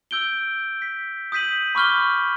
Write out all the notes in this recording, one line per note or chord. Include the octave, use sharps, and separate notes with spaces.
E6 G6 D7 G7
B6
D#6 G6 B6 D#7 F#7
B5 C#6 D6 F6 G6 G7